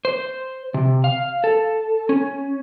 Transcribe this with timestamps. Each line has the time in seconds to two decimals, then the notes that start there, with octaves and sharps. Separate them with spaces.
0.05 C5
0.74 C3
1.04 F5
1.44 A4
2.09 C#4